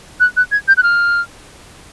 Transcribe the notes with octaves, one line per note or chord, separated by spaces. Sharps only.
F#6
F#6
G#6
G6
F#6
F6